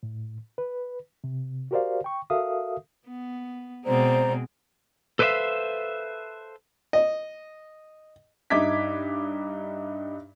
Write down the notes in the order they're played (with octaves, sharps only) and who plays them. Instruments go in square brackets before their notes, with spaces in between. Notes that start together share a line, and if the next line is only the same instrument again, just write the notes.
[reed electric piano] A2
B4
C3
F#4 G4 A#4 C5 D5 F5
G5 C#6
F#4 A4 A#4 E5 F5 D#6
[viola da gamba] B3
[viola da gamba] B2 G#3 C4 [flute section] C5 D5 A#5
[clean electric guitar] A4 B4 C5 D5 E5 F5
[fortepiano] D#5
[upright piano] G2 D#4 E5 D6 G#6 B6